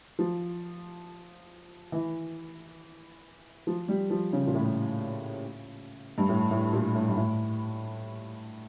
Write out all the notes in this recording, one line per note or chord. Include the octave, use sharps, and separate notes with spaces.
F3
E3
F3
G3
F3
C#3
A#2
A2
G2
A2
A2
A#2
A2
G2
A2